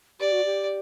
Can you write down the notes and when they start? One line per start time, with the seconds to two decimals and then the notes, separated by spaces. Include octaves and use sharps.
0.20 G4 D5
0.32 F#4
0.45 G4